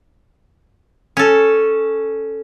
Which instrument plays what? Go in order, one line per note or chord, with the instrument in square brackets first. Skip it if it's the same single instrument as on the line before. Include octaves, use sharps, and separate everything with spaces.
[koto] C#4 A4